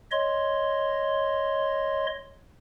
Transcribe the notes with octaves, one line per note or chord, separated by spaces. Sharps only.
C#5 D#5 C6